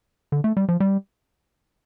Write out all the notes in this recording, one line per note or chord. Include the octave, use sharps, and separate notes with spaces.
D3
A3
G3
F3
G3